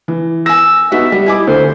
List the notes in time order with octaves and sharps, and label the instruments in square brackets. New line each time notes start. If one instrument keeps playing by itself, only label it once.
[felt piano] E3
[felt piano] G#5 A#6 [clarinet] E6
[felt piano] B3 D#4 F#4 [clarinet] E5
[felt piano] G3
[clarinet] E4 [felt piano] D#5 G#5 D6
[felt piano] D2 [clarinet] C5